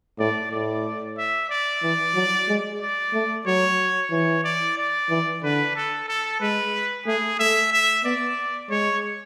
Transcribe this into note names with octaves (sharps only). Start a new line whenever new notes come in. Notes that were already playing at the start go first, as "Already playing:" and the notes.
A2 D5
A2 D5
E5
D5
E3
F#3
G#3
D5
A3
F#3 C#5
E3 C#5
D5
D5
E3
D3 B4
A4
A4
G#3 B4
A3 G#4
A3 E5
E5
B3 D5
G#3 C#5